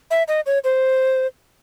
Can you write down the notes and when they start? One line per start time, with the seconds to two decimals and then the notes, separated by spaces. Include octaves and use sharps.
0.11 E5
0.28 D#5
0.46 C#5
0.64 C5